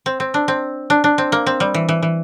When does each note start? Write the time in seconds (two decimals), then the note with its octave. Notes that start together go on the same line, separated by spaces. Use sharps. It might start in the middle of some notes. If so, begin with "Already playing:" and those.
0.06 C4
0.20 C4
0.34 D4
0.48 C4
0.90 D4
1.04 D4
1.18 C4
1.32 A#3
1.46 C4
1.60 G3
1.74 E3
1.89 E3
2.02 E3